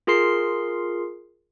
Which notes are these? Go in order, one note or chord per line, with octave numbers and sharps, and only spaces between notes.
F4 G#4 A#4 C6 C7